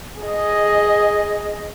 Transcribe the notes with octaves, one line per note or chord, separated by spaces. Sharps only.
G#4 D#5